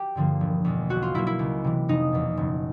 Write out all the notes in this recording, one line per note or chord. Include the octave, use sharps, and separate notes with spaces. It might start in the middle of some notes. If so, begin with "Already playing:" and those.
Already playing: G4
G2 D3 F3 A#3
E1
E2 B2 G#3
B1 F#4
F4
B2 F#3 A#3 E4
E4
C#2
C3 E3
F1 D#4
E2 B2
F#1